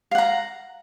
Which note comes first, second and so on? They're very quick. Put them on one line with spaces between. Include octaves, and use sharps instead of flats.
F5 F#5 A#5